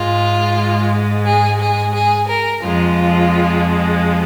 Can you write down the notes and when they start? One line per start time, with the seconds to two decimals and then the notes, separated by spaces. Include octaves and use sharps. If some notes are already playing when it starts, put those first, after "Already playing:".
Already playing: G#2 G#3 F4
1.26 G#4
1.60 G#4
1.94 G#4
2.29 A#4
2.63 F2 F3 G#3 F4